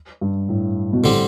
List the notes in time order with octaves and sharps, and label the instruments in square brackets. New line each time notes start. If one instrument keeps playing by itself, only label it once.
[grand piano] G2
A2
B2
[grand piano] A2 [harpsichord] D3 G3 C4 G4